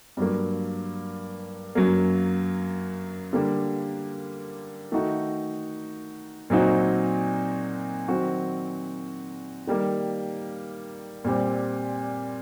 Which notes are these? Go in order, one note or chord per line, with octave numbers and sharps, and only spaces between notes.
G2 F#3 A#3
F#2 F#3 A#3
D3 G3 A#3
D#3 A3 D#4 F#4
A#2 F#3 C4 D#4 F#4
D#3 F#3 C4 F#4
D#3 G3 A#3
A#2 G3 C4